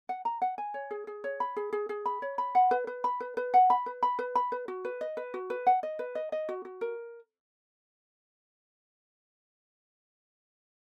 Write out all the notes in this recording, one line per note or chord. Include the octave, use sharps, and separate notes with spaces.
F#5
A#5
F#5
G#5
C#5
G#4
G#4
C#5
B5
G#4
G#4
G#4
B5
C#5
B5
F#5
B4
B4
B5
B4
B4
F#5
B5
B4
B5
B4
B5
B4
F#4
B4
D#5
B4
F#4
B4
F#5
D#5
B4
D#5
D#5
F#4
F#4
A#4